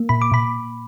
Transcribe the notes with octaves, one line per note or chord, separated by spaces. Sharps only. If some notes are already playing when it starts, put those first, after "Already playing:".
Already playing: A#3
A#2 B5
D6
A#2 B5